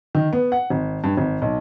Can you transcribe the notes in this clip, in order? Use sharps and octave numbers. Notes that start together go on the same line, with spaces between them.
D#3
B3
F#5
G#1
G2
G#1
B1